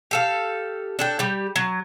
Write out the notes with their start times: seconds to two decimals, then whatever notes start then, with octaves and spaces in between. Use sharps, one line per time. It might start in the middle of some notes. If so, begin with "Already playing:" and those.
0.11 G4 A4 F5
0.99 D4 A4 G5
1.19 G3 G4
1.56 F#3